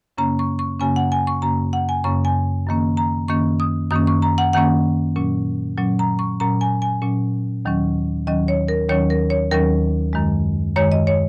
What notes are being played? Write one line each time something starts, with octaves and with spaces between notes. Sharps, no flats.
F#2 C#3 A#3 C#4 A#5
C#6
C#6
F#2 C#3 A#3 C#4 G#5
F#5
G#5
C#6
F#2 C#3 A#3 C#4 A#5
F#5
G#5
F#2 C#3 A#3 C#4 C#6
G#5
F#2 D#3 A#3 C#4
A#5
F#2 D#3 A#3 C#4 C#6
D#6
F#2 D#3 A#3 C#4 D#6
C#6
A#5
F#5
F#2 D#3 A#3 C#4 F#5
A#2 F#3 C#4
A#2 F#3 C#4
A#5
C#6
A#2 F#3 C#4 A#5
G#5
G#5
A#2 F#3 C#4
D#2 D#3 F#3 C#4
D#2 D#3 F#3 C#4 D#5
C#5
A#4
D#2 D#3 F#3 C#4 C#5
A#4
C#5
D#2 D#3 F#3 C#4 A#4
F#2 D#3 G#3
F#2 D#3 G#3 C#5
D#5
C#5